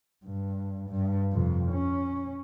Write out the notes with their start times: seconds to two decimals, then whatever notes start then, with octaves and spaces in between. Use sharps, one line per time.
0.24 G2
0.89 G2
1.32 F2 C3
1.71 C#4